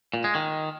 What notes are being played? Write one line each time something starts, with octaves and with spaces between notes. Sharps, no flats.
A#2
G#3
D#3